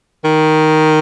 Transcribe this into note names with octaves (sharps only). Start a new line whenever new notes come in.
D#3